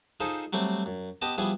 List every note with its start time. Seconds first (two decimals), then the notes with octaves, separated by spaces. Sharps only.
0.20 D#4 F4 G#4 A4 C5
0.53 F#3 G3 A3 C4
0.86 F#2
1.22 B3 G4 D#5 A5
1.38 F3 G3 B3 E4 G#4